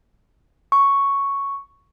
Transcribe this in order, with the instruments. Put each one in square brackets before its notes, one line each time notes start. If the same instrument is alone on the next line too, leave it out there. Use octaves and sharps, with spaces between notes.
[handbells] C#6